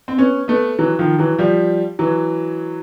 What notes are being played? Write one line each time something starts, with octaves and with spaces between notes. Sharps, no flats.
C4
B3 C#4
A3 B3
E3 F#3
D#3 F3
E3 F#3
F3 G3
E3 F#3